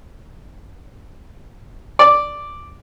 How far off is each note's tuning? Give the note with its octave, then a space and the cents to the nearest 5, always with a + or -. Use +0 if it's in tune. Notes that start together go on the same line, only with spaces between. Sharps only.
D5 +0